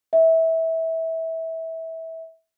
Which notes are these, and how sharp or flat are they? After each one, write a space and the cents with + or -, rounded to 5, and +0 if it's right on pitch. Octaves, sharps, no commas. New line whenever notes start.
E5 -20